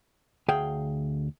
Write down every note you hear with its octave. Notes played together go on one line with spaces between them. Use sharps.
D2 G#4 F5 G5